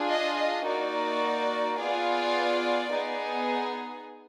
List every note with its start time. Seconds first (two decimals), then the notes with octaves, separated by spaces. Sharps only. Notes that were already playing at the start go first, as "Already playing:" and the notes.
Already playing: D4 F4 G#4
0.09 D#5
0.37 D#5
0.65 A#3 D#4 F#4 D5
1.78 B3 F4 G#4 D5
2.91 B3 D#4 G#4